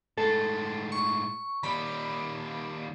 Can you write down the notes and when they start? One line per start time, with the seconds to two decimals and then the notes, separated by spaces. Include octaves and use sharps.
0.18 A2 G#3 A4
0.92 C#6
1.63 D#2 G3 B5